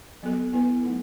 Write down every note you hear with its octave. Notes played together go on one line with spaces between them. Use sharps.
F#3 B3 F#4 A4
B3 E4 B4
F#3 A3 D#4 A4